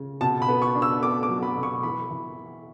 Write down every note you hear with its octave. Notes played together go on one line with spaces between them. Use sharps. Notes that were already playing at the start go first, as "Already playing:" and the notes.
Already playing: C#3
B2 A5
B5
B3
C#6
D4
E6
B3 D6
D6
F#3
B5
B2
C#6
E3 B5
E3